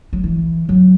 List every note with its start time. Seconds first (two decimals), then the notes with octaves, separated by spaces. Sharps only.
0.13 F#3
0.24 E3
0.69 F#3